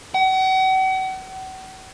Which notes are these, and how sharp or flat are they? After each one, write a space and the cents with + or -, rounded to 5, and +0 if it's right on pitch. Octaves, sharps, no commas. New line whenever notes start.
F#5 +40